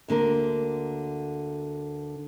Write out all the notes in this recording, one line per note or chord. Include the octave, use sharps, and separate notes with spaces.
D2 D3 A#3 A#4